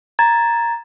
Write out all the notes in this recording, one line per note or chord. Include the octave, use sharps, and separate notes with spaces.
A#5 G#6 A6